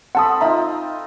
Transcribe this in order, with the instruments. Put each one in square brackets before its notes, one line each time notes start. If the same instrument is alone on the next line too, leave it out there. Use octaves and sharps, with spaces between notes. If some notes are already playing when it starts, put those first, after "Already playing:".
[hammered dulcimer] C4 A4 B5 [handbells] F#5 A5 D#6
[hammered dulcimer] C4 D#4 F4 [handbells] E5 A#5